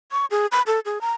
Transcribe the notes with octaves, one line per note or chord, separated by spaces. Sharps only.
C#6
G#4
B5
A4
G#4
A#5